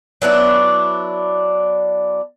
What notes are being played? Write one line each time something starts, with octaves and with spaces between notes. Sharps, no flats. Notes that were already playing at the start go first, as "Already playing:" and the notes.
F#3 B3 D4 E4